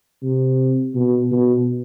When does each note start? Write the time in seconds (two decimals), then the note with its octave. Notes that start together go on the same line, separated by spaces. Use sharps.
0.23 C3
0.95 B2
1.32 B2